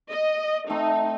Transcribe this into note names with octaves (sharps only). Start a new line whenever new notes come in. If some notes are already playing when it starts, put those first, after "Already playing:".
D#5
A3 C4 D#4